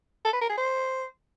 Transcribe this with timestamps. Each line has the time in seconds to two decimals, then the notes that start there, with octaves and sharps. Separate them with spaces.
0.25 A4
0.33 B4
0.41 A#4
0.49 G#4
0.58 C5